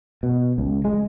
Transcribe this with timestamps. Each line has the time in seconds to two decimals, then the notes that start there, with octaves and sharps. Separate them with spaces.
0.23 B2
0.58 C#2
0.85 G#3